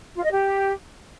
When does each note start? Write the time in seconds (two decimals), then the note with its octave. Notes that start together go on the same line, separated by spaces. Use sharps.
0.16 F4
0.24 D#5
0.31 G4